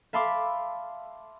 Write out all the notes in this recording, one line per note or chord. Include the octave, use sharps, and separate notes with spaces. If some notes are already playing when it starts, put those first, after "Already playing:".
E5 F5 A5 B5 C6 D6